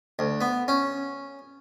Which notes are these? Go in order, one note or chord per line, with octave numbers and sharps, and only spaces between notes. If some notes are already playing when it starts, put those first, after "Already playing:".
D2
B3
C#4